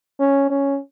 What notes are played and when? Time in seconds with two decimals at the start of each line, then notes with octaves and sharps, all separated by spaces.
0.20 C#4
0.50 C#4